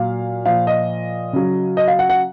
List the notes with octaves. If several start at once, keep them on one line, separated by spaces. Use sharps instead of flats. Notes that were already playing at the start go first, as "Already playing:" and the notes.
Already playing: A#2 F#3 F5
A#2 F3 F5
D#5
C#3 F#3
D#5
F5
F#5
F#5